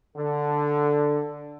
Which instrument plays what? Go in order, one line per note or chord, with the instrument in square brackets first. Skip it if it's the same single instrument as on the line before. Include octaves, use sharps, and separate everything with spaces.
[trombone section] D3 [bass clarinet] A4